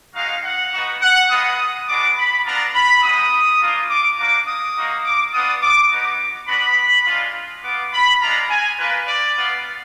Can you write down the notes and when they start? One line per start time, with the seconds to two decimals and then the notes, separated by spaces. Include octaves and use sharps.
0.15 G#3 D#4 F#4 F5
0.44 F#5
0.72 B3 D#4 F#4
1.02 F#5
1.30 G#3 B3 F4 D#6
1.88 G#3 B3 D4 F#4 D6
2.17 B5
2.45 B3 D4 F4 A#5
2.74 B5
3.03 G#3 B3 D#4 D#6
3.61 A#3 D4 F4
3.90 D6
4.18 A#3 D4 F#4 D6
4.47 D#6
4.76 A#3 D#4 F#4
5.05 D6
5.33 B3 D4 F4 D#6
5.62 D6
5.91 B3 D#4 F#4 D6
6.48 B3 D4 F#4 B5
7.06 G#3 D4 F4
7.63 B3 F4 D6
7.93 B5
8.21 G#3 D4 F4 A#5
8.50 G#5
8.79 A#3 F4 B4
9.08 D5
9.37 B3 F4